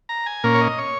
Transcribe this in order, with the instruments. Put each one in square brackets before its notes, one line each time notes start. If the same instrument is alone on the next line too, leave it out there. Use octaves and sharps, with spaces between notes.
[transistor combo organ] A#5
G#5
A#2 A#3 C#4 A#4
C#5
D#5
C#5